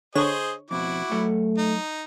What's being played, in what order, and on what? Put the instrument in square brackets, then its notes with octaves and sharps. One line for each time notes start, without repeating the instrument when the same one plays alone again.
[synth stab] D3 C#5 [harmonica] G#4 C5 D#5
[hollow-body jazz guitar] F2 B2 [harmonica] E4 F#4 D6
[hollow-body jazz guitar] F#3 A4 F#5 [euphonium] A3
[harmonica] D#4